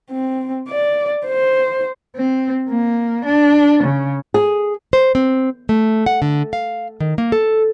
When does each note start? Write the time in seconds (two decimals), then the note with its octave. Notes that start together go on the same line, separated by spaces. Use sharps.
0.11 C4
0.69 D5
1.27 C5
2.16 C4
2.69 A#3
3.25 D4
3.84 C#3
4.34 G#4
4.93 C5
5.15 C4
5.69 A3
6.06 F#5
6.22 D3
6.53 F5
7.00 D#3
7.18 A#3
7.32 A4